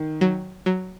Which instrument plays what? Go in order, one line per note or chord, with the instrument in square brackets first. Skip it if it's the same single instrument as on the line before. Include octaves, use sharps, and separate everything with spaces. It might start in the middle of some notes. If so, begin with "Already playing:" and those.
Already playing: [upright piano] D#3
[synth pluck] F#3
F#3